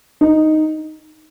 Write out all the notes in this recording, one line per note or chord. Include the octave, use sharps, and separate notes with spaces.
D#4